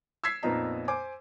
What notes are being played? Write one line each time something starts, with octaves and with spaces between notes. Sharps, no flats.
E6 G#6 B6 C7
F2 A#2 B3 D#4 A#5
C5 G#5 D6